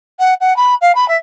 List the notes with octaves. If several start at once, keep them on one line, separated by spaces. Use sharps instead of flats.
F#5
F#5
B5
F5
B5
E5